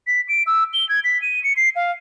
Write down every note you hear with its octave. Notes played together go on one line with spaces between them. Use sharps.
B6
D7
E6
G7
G#6
B6
D#7
C#7
C7
F5